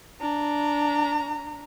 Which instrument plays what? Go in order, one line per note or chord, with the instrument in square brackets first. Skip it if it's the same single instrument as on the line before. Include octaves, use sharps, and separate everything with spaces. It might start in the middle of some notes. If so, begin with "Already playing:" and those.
[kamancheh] D4 A#5